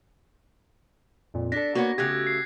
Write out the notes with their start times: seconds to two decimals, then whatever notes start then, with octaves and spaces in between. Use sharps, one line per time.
1.34 F2 A#2
1.52 D4 A4 A#6 B6
1.75 A#3 B3 F#4 C#5
1.98 C#3 A3 G4 F#6 G#6
2.27 C7